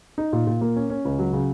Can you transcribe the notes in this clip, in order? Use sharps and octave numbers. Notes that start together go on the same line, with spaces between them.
D#4
A#2
A#2
A#3
C#4
C#4
C#2
F#3
C#3